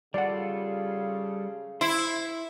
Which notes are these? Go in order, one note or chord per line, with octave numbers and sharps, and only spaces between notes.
C#3 G3 F4 A4 D5 F#5
E4 C5 C6